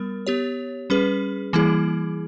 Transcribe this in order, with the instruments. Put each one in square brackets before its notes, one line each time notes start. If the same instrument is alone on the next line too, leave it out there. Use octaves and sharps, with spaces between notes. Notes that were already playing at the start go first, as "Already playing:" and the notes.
Already playing: [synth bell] G3 B3 A#4
B3 G4 C#5
G3 C#4 G#4 B4
E3 G3 A#3 E4 G#4